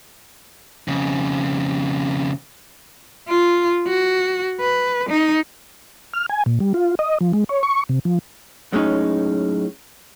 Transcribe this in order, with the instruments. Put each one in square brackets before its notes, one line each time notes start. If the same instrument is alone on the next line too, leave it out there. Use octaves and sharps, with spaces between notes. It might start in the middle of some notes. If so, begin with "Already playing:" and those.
[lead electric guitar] F2 C#3
[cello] F4
F#4
B4
D#4
[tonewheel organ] F6
G#5
A#2
G3
F4
D#5
F3
G#3
C#5
C#6
C3
F3
[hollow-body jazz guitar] F#2 A2 G#3 A3 C#4 D#4